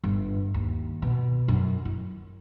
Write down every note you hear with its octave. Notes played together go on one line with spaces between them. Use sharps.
G1
D#2
B2
F#2
E4